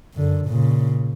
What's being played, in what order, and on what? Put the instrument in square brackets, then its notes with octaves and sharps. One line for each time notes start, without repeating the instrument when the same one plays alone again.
[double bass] F#2 D3
A#2 C#3